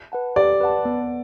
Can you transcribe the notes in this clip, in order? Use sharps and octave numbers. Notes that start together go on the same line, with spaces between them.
B4 F#5 A5
G4 D5
B4 F#5 A5
B3